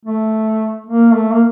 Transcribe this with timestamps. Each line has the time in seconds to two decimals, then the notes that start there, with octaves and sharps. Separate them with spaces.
0.05 A3
0.87 A#3
1.13 A3
1.33 A#3